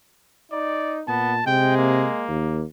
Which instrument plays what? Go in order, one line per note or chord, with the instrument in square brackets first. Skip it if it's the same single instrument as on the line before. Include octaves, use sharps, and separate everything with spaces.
[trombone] D#4 [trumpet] D5
[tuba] A#2 [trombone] B3 [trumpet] A5
[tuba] C3 [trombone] G#3 [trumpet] G5
[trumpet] A#3
[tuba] D#2